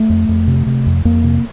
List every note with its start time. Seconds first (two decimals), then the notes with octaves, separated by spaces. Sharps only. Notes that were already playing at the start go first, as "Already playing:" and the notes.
Already playing: A3
0.09 F2
0.29 F2
0.47 C3
0.66 C3
0.86 F2
1.05 F2 A#3
1.24 C3